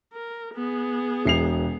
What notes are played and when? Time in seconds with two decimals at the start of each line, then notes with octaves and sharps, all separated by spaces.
0.13 A#4
0.54 B3 G#4
1.25 E1 C7 F7